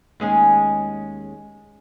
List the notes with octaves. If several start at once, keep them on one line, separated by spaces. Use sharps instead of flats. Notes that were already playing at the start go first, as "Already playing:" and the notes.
D#2 G#3 C#4